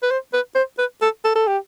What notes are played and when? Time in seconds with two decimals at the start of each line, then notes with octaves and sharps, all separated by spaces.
0.03 B4
0.11 C5
0.34 B4
0.55 C5
0.78 B4
1.02 A4
1.25 A4
1.36 A4
1.47 G4